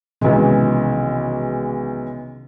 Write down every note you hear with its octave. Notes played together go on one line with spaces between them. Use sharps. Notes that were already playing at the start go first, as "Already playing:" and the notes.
B1 C3 D#3 E3 G#3 C#4